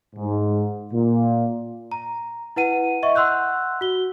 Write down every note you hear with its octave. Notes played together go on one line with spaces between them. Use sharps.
G#2
A#2
A#5
E4 B4 F#5 D#7
D#5 E5 C#6
F#5 C6 E6 F#6 G6
F#4 G7